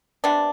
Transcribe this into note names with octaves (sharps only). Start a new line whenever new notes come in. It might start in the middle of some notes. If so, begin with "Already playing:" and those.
C3 G3 B3 D4